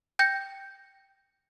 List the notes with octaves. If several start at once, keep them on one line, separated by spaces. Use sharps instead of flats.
G5 G6 A#6 C#7